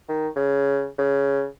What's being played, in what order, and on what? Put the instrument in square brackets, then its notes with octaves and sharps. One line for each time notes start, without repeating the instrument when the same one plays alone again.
[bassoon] D#3
C#3
C#3